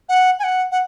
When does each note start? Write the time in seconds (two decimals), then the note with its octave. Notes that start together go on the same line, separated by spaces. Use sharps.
0.09 F#5
0.39 G#5
0.44 F#5
0.72 F#5